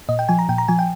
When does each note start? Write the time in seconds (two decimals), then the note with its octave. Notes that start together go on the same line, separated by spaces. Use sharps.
0.09 A#2 D#5
0.19 G5
0.29 F3 G#5
0.39 A#5
0.49 A#2 G5
0.58 A#5
0.68 F3 G#5
0.79 G5